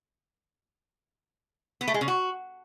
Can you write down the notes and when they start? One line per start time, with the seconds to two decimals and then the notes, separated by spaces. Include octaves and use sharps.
1.81 B3
1.88 A3
1.94 G#3
2.01 C#3
2.08 F#4